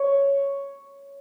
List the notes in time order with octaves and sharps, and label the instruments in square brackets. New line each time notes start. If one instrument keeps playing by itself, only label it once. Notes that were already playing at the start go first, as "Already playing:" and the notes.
Already playing: [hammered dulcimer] C#5